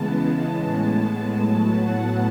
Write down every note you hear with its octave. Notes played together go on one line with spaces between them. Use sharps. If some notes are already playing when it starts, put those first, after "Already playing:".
Already playing: C#3 E3 G#3 B3 A5
A5
A2 G#3 B3
A2 F#3 B3 A5
F#5